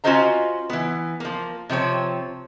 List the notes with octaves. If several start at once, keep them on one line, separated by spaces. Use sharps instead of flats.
C#4 F4 F#4 C5 D#5 A#5
E3 B3
F3 A#3
C3 F3 C4 C#5